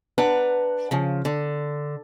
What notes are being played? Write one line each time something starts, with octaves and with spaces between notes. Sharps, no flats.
D4 B4 F#5 A#5
C#3 F3
D3